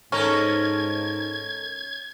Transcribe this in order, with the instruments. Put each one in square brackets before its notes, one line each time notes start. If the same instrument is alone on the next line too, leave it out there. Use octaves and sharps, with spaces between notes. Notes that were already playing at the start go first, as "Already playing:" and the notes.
[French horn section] G#2 [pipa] C#4 [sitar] D#4 A4 A#4 [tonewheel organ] G#6